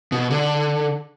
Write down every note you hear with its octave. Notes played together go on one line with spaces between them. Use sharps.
B2
D3